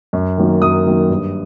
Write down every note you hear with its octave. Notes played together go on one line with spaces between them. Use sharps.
F#2
D#3 F#3 A#3
F#2 D#6
D#3 F#3 A#3
G2